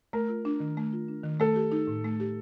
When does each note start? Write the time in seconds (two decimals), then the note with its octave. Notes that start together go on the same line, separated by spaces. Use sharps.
0.13 A3 A#4
0.29 F4
0.45 D4
0.60 D#3
0.77 A3
0.93 F4
1.08 D4
1.24 D#3
1.40 A3 A4
1.56 G4
1.72 D#4
1.87 A2
2.04 A3
2.20 G4